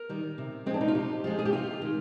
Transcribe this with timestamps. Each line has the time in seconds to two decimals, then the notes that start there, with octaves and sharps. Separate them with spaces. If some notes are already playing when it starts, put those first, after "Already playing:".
Already playing: A#4
0.09 D#3 G3
0.38 C3
0.66 F3 G#3 C4
0.74 D4
0.81 D#4
0.88 F4
0.95 C3 G4
1.24 F3 G#3 F4
1.39 G#4
1.45 G4
1.52 C3 F4
1.82 D#3 G#3